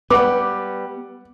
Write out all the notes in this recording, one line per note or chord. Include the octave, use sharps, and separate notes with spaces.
G3 B3 B4 F#5 D6